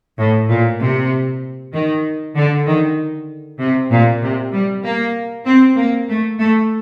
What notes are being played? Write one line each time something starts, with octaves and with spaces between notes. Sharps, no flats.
A2
A#2
C3
D#3
D3
D#3
C3
A#2
C3
G3
A#3
C4
A#3
A3
A3